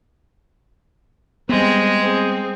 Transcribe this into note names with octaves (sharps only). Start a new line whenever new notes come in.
G3 G#3 B3 C4 G#4
C4 G#4